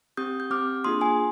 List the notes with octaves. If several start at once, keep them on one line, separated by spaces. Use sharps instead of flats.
C4 G4 D#6 G6
G6
C4 G4 D6 F6
A#3 D4 F4 G#4 C6 D#6
G#5 C6